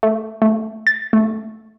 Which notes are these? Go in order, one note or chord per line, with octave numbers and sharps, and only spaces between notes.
A3
A3
A6
A3